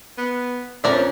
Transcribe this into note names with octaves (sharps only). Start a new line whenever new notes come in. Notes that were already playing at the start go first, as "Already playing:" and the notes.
B3
F2 D3 C4 C#4 A#4 D5 E5